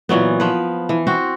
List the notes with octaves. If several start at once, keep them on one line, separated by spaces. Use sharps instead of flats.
A#2 E3 F#3 B3
F3 B4
E3
C4 F#4